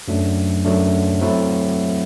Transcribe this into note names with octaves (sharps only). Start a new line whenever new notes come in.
F#2 F#3 A3 D4
F#2 F#3 A3 D4
F#3 A3 C4 E4